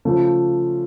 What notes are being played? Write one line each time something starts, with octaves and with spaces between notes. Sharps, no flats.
C#3 F3 A3